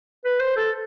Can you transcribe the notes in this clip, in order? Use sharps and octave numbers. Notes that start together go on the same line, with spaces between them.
B4
C5
A4